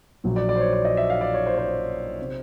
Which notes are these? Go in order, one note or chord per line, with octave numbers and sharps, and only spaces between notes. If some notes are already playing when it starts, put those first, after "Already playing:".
A#1 A#2 F#3
D5
D5
C5
C#5
D5
D#5
E5
F5
D5
C#5
C5
C#5
C5
C3